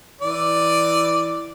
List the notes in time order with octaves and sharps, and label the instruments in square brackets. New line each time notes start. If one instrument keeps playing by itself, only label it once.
[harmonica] E3 D5